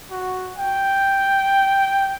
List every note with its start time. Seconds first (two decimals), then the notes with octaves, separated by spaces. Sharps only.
0.11 F#4
0.56 G5